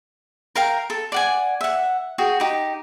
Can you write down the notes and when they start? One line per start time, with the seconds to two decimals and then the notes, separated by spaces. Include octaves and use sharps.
0.55 A#4 F5 G5 A#5
0.90 A4
1.12 D5 F#5 G#5
1.61 E5 F#5
2.18 F#4 G#4 G5
2.40 D#4 G4